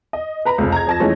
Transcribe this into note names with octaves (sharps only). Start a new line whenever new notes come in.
D#5
B4 A#5 B5
F1 C#2
A#5 G#6
F2 A5 A#6
E3 F3 G#3 A3 C#4 D#4